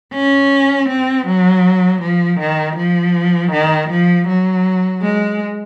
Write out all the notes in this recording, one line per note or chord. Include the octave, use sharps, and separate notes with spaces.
C#4
C4
F#3
F3
D#3
F3
D#3
F3
F#3
G#3